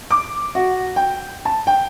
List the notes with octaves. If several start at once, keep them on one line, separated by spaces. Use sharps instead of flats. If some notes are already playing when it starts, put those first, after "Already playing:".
D6
F#4
G5
A5
G5